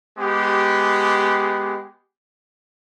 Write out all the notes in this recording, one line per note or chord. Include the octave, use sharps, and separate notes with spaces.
G#3 B3 G4